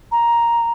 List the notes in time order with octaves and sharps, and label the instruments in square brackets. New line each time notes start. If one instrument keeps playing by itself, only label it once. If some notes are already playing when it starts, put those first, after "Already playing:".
[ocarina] A#5